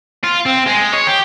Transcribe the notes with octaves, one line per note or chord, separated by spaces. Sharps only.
F4
C4
G#3
C#5
G4